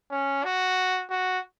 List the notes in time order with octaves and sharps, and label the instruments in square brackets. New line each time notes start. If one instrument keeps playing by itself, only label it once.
[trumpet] C#4
F#4
F#4